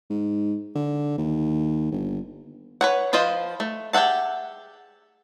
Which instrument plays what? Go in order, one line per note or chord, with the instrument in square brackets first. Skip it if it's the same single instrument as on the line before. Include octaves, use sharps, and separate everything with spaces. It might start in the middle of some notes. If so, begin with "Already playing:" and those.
[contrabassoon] G#2
D3
D#2
G1
[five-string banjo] B4 C#5 F#5
F3 F4 B4 C5 D#5
A3
G4 G#4 E5 F#5 A5